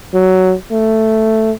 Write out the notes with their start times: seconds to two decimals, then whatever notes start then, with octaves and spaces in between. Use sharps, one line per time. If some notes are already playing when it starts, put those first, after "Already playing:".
0.14 F#3
0.72 A3